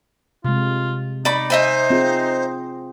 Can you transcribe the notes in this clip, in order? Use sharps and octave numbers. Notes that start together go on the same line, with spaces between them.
C3 G#3 F4
D#4 D5 B5 C#6
C5 D#5 E5 G#5
C4 F4 G#4